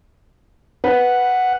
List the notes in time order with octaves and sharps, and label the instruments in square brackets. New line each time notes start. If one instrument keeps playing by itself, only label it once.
[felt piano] B4 [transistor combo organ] F#5